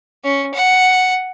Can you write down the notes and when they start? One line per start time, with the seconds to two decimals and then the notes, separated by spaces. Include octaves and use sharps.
0.24 C#4
0.54 F#5